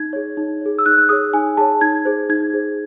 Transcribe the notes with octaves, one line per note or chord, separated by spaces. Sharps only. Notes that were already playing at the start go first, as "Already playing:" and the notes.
Already playing: D#4 G#6
G#4 C#5
D#4
G#4 C#5
E6
D#4 F#6
F#6
G#4 C#5 D#6
D#4 G#5
G#4 C#5 A5
D#4 G#6
G#4 C5
D#4 G#6
G#4 C5